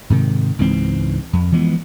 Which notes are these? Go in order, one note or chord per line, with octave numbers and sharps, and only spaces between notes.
G#2 C3 D#3
C#2 G#2 E3 C4
F2
E3 F3 G#3 B3